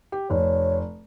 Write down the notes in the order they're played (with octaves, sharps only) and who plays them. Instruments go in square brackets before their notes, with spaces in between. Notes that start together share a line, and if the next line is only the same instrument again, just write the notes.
[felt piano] G4
[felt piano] F1 [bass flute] C#5